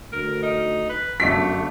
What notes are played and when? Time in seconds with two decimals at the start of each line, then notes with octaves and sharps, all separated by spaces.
0.13 D2 A#4
0.43 D#4
0.89 B4
1.20 G1 F#2 A3 B6